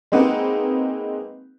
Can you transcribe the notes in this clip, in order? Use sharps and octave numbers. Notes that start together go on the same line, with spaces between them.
G#3 A#3 C4 D#4 B4 F#5